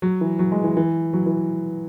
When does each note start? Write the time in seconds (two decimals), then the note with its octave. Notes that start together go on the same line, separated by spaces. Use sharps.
0.02 F#3
0.21 E3
0.39 F#3
0.52 G#3
0.64 E3
0.77 E3
1.13 F#3
1.26 E3